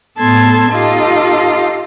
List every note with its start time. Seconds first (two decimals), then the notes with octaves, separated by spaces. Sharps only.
0.19 A2 B3 A4 A5 C6 G#6
0.71 D#4 F4 G4 A4